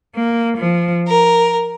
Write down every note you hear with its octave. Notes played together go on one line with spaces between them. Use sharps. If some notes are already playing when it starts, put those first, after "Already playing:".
A#3
F3
A#4